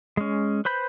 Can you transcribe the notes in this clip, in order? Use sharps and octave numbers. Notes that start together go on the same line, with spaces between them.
G#3 C#4
B4 C5 B5 G6